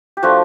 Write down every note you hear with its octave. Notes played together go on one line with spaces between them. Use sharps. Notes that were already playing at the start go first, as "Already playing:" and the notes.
G4
F3 A3 D4 F4 F#4